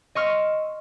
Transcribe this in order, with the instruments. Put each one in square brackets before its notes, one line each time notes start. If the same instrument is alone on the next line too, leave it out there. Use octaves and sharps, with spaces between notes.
[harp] D#5 C6 C#6 E6 F6